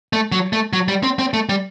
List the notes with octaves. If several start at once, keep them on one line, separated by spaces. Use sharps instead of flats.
A3
F#3
A3
F#3
G3
C4
C4
A3
G3